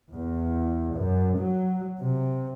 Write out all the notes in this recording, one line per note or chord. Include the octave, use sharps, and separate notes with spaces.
E2
F#2
F#3
C3